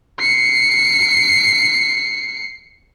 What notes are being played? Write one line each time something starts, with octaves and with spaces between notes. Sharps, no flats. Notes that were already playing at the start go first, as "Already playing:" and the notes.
C7 C#7